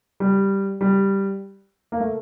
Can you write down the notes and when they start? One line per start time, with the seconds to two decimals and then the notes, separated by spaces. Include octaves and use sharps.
0.20 G3
0.81 G3
1.92 A#3
2.00 A3